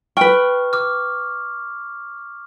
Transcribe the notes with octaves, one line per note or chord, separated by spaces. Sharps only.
B4 G5 C#6 F6
D6 F6